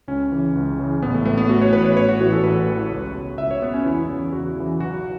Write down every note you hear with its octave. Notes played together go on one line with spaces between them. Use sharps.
C#2 C#4
C#3 E3
C#2
C#3 E3
A1 B3
A3
A2 E3 A3
B3
A1 F#4
C#5
A2 E3 B4
C#5
A1 C#5
F#4
A2 E3 F#4
A4
A1 B4
A2 E3
C#2
B2
C#2 E5
C#5
B2 B3
C#4
E2 E4
C#3 E3
E2 F#4
C#3 E3
B1 F#4